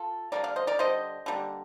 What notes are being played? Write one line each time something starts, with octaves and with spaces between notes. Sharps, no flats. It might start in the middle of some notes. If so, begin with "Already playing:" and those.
Already playing: F4 A4
D3 G3 A#3 A#4 D5
D5 F5
C5 D#5
A#4 D5
D3 G3 C5 D#5
D3 G3 A#3